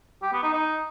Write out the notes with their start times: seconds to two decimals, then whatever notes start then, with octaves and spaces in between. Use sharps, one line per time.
0.22 G4
0.33 B3
0.43 D#4
0.53 D#4